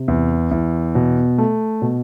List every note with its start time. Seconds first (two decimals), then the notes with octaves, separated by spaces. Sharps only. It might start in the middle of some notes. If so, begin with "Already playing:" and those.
Already playing: C3
0.08 E2
0.51 E2
0.95 B2
1.38 A3
1.82 B2